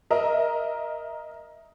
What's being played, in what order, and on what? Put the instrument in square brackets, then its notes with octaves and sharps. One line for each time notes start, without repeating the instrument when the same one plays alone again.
[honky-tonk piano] A#4 D#5 E5 A#5